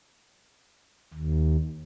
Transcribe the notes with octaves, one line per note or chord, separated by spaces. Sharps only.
D#2